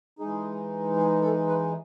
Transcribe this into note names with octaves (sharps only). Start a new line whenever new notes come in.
E3 G#3 D#4 G#4
G#4
A4
B4